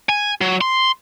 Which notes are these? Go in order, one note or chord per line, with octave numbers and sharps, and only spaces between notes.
G#5
F#3
C6